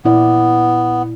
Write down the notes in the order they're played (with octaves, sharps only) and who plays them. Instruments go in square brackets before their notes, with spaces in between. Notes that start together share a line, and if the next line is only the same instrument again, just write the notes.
[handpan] A#2 E4 D5 [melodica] B3